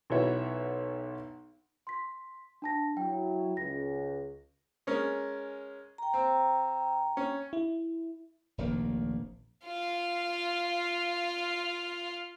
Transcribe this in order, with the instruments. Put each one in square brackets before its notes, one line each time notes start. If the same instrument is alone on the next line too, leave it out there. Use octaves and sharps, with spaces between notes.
[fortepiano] B1 E4 F#4 B4 C#5 E5
[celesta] C6 B6
D4 A5 A#6
[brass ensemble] F#3 E4 [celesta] G5
[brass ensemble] C#2 [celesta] A#6
[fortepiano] G#3 C#4 A#4
[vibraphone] G5 A#5
[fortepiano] C4
C#4
[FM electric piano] E4
[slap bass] F1 A#1 D#3 A#3
[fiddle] F4 F5